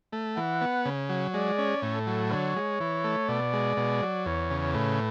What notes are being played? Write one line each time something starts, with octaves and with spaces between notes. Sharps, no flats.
A3
E3 F#5
B3
C#3
F#3
G#3 D5
C#4
A2 A4
F#3
D3 C#5
G#3
E3
A3
B2 D5
G#3
B2
F#3
E2 C#5
C#3
A2 B4